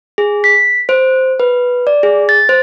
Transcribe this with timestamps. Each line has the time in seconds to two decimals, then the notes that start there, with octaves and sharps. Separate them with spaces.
0.18 G#4
0.44 B6
0.89 C5
1.40 B4
1.87 D5
2.03 G#4
2.29 A6
2.49 C5